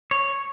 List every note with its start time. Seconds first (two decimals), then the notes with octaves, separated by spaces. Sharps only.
0.11 C#5